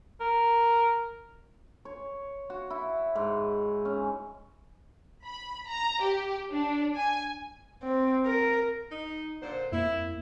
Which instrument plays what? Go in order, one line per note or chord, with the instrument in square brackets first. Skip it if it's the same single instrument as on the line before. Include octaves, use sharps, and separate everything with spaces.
[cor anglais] A#4
[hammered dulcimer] C#5
F#4
E4
G#2
C#4
[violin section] B5
A#5
G4
D4
G#5
[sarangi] C4
A#4
[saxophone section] D#4
A#2 D3 C5
[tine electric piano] F2 A#3 [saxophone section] E4